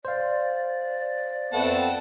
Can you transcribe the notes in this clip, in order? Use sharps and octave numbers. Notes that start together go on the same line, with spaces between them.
C5 D5 F5
F2 A3 B3 C4 F#5 A5